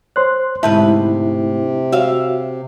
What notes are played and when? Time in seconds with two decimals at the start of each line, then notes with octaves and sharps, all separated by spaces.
0.16 C5 C#5 C6 F#6
0.63 D2 G#2 C3 E4 B4 E5 A5 G6
1.92 F#4 C#5 E5 F5